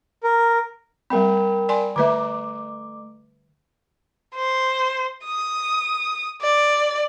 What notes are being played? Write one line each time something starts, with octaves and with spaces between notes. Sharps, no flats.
A#4
G3 A3 C4 A#4 G5 B5
D5 G#5 C6
D3 A3 B4 E5 D6
C5
D#6
D5